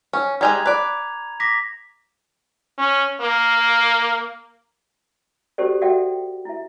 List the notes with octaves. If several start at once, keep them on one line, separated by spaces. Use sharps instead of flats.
C#4
G3 G#3 G#5 A#5 G#6 F7
B4 D5
D6 A#6 B6
C#4
A#3
C#4 F#4 G4 A4 C5 D5
F#4 A4 D5 E5 F#5 G5
E4 E5